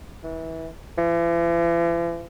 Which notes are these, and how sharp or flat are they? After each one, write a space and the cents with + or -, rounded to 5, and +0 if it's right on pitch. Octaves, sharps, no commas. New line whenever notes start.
E3 -25
E3 +45